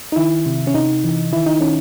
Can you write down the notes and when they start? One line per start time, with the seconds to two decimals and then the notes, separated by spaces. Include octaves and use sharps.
0.12 D#4
0.16 D#3 E4
0.46 C3
0.67 C#4
0.74 C3 D#4
1.04 E3
1.32 D#3 E4
1.46 D#4
1.60 D#3 C#4